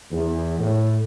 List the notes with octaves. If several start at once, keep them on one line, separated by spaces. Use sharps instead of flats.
E2
A2